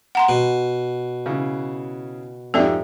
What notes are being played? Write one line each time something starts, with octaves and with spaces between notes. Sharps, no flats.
F#5 A#5 C6
B2
C#3 E3
F2 G#2 G4 A4 D5 E5